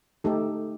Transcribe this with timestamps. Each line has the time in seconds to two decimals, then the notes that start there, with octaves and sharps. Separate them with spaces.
0.24 A3 D#4 G4 A4